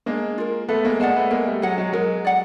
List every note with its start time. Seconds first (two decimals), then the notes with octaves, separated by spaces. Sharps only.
0.06 G#3 A#3 D4
0.38 F4 A#4
0.68 A3 B3 A4
0.85 G#3 A#3
1.00 G#3 A#3 D5 F#5 A5
1.16 A3 B3
1.31 G#3 A#3 A#4
1.47 G3 A3
1.62 F#3 G#3 D#5 F#5
1.78 F#3 G#3
1.93 F#3 G#3 A#4
2.25 D5 F#5